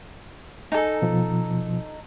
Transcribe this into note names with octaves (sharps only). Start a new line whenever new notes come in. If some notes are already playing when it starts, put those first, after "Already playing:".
D#4 A4 G#5
B2 F3